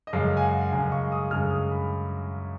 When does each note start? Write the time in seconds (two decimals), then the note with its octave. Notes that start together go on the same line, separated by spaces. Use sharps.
0.07 D#5
0.13 F#2 C#3 G#3 F5
0.37 G#5
0.42 F#5
0.72 F#2 C#3 G#3 G#5
0.92 C#6
1.12 D#6
1.31 F#2 C#3 G#3 F6
1.50 D#6
1.71 B5